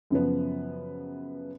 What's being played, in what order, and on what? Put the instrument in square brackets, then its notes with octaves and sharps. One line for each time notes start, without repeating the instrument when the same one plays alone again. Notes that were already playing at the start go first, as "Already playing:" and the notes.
[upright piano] F#2 C#3 F3 B3